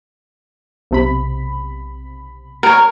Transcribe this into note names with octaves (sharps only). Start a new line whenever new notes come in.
B1 C3 B5
A#4 C#5